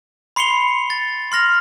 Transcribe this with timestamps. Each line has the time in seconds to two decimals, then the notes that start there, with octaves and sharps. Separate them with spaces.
0.36 B5 C6 C7 C#7 F7 G7
0.90 A6
1.32 C6 F6 A#6 F7